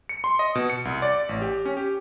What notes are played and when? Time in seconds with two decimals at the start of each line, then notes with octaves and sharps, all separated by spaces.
0.09 C#7
0.24 C6
0.39 D#5
0.55 B2
0.70 C#7
0.85 C2
1.02 D5
1.29 A1
1.42 G4
1.66 C#4
1.77 G4